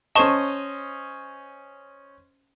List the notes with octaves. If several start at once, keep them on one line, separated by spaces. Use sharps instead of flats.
C#4 C5 D#5 A5 C#6 E7